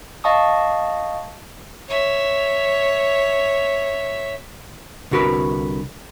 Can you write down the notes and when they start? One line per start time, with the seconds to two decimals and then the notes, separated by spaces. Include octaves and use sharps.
0.24 D#5 F5 A5 C#6 D#6
1.89 C#5 E5
5.11 C2 D3 F#4 A#4 B4